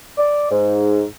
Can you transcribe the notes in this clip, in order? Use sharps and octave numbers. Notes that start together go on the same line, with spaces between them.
D5
G#2